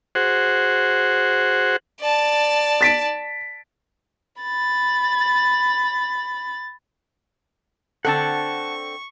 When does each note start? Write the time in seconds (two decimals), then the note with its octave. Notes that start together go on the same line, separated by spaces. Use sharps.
0.15 F#4 G#4 C5 F#5
2.00 D5 A5
2.81 A6 B6 D7
4.42 B5 A6
8.05 D3 C4 A4 F#5 A5 C#6